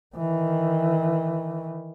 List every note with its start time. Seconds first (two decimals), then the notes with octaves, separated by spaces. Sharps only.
0.16 D#3 E3